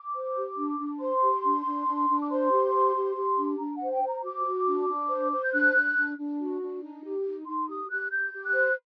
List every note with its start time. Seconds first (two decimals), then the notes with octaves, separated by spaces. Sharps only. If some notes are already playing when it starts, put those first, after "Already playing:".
Already playing: D6
0.15 C5
0.36 G4
0.58 D4
0.80 D4
1.00 C5 C6
1.23 G4
1.44 D4
1.66 D4
1.87 D4
2.08 D4
2.22 D6
2.31 C5 C6
2.51 G4
2.73 C5
2.95 G4
3.16 G4
3.37 D4
3.59 D4 A#5
3.76 F#5
3.81 C5
3.91 G5
4.03 C5
4.08 A#5
4.24 F#4 D6
4.46 F#4
4.67 D4
4.89 D4
5.09 C5
5.32 C5
5.43 G6
5.53 D4 F#6
5.75 D4
5.97 D4
6.17 D4
6.39 F#4
6.61 D4
6.82 D#4
7.04 G4
7.26 D#4
7.47 D#4 C6
7.68 G4 D#6
7.90 G4 F#6
8.11 G4 G6
8.33 G4
8.44 F#6
8.54 C5